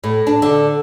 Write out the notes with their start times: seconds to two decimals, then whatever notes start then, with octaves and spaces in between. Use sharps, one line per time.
0.04 A2
0.27 D4
0.42 D3